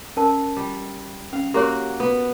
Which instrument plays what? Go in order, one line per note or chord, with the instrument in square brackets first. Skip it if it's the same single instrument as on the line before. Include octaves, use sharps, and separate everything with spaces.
[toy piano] C#4 A#4 A5
[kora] G3
[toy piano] C#4 [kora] F5
[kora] A#3 F#4 [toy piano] G4 A#4 C#5
[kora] B3